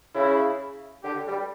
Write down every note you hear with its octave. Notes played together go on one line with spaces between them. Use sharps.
C#3 E4
D3 G4
G3